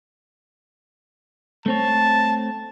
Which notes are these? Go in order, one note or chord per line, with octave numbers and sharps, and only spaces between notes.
A3 C4 C#5 A5